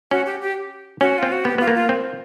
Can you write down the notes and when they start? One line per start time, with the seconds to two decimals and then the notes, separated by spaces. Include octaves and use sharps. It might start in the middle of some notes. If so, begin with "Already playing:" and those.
0.11 C#4 F#4
0.26 G4
0.41 G4
1.01 C#4 F#4
1.18 C4 F4
1.32 F#4
1.44 B3 G4
1.58 B3 F4
1.68 A#3
1.75 F4
1.89 C4